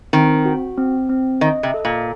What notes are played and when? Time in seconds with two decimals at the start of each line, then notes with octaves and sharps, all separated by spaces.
0.13 D#3 C4
0.45 F#4
0.78 C4
1.09 C4
1.41 D#3 D#5
1.63 C3
1.74 A4
1.85 A#2